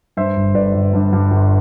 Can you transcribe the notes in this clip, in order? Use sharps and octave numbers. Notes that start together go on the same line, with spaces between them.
G2 C5 E5
G1
G1 B4 D5
G1
G2
G2
G1